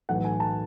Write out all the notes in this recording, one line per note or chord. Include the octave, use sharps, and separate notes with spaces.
B1 A2 E3 F#5
G#5
A5